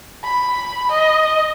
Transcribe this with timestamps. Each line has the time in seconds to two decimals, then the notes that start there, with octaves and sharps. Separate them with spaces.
0.24 B5
0.91 D#5